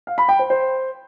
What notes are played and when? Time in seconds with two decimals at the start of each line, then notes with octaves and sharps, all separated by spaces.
0.07 F5
0.18 B5
0.29 G5
0.39 C5
0.50 C5